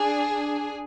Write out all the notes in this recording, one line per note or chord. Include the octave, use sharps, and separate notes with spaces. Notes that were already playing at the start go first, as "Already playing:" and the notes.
Already playing: D4 G#4